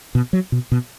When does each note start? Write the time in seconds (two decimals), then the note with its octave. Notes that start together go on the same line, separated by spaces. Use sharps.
0.15 B2
0.33 F#3
0.52 B2
0.72 B2